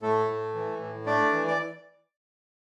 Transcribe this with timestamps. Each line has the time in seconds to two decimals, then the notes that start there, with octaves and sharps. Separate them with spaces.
0.02 A2 A3 A4
0.28 A2
0.55 E3
0.80 A2
1.06 A3 D4 D5
1.32 E3
1.48 D5